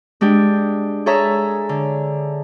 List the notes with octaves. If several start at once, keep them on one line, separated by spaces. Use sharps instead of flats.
G#3 D4 G4
G#4 A4 C#5 E5 A#5
D3